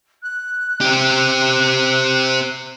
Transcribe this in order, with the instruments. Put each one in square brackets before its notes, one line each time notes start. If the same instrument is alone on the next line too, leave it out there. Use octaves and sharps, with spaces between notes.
[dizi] F#6
[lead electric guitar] C4 G4